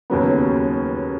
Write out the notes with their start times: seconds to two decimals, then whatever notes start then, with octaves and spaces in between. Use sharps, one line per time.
0.10 D#2 C#3 F#3 B3